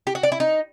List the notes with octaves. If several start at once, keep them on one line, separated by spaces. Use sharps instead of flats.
G4
F#4
D5
E4
D#4